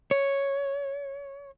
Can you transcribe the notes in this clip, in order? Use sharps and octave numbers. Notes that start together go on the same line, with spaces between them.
C#5